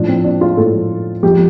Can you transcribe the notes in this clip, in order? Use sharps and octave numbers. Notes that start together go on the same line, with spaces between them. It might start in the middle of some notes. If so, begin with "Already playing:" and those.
Already playing: A2 F3 D4
C4
D4
F4
A2 F3 A4
F2 F3 G4